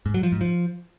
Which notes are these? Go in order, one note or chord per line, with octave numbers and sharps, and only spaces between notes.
G#2
F#3
F3
G#2
F3